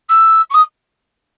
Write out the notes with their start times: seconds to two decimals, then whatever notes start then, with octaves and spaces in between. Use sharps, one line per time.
0.09 E6
0.50 C#6
0.54 D#6